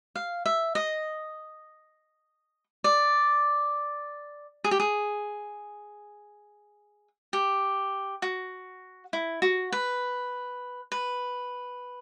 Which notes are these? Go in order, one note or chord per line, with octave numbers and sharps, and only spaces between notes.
F5
E5
D#5
D5
G#4
G4
G#4
G4
F#4
E4
F#4
B4
B4